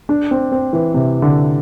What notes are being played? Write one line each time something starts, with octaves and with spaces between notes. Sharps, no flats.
D4
C4
C4
E3
C3
D3